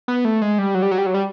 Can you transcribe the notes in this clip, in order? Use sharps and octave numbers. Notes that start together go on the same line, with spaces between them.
B3
A3
G#3
G3
F#3
G3
F#3
G3
F#3
G3